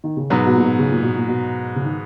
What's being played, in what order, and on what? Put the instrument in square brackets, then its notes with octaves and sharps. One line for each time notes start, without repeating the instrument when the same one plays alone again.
[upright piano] D#3
C#3
[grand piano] G#2 F#3 B3 [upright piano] B2
[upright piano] B2
A#2
B2
C#3
A#2
B2
A#2
B2
C#3
D#3